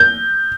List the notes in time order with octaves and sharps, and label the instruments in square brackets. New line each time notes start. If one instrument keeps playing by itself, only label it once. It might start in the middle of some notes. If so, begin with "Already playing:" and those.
Already playing: [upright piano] G6